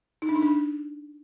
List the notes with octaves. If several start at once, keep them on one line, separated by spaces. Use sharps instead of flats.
D#4
D4
D#4
D4